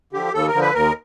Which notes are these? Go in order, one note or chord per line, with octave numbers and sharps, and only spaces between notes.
D3 F3 G4
D#2 A4
A#4
D3 F3
B4
D#2 A#4